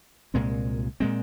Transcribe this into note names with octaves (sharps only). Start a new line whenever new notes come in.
C2 A#2 G#3 C4
A#2 G#3 C4